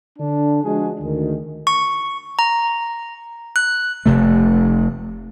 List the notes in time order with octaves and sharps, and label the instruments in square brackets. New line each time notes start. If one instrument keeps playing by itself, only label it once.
[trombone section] D3 D4
F3 G#3 D4 F#4 G#4
D2 D#3
[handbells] C#6
A#5
F#6
[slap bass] F1 C3 A3